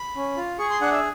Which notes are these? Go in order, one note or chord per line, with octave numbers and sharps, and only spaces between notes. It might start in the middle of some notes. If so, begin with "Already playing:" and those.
Already playing: B5
C#4
F4
G#4 C#6
C6
D4 F#5
E5